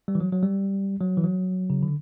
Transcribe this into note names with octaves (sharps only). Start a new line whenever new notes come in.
G3
E3
F#3
F#3
G3
F#3
E3
F#3
C#3
D3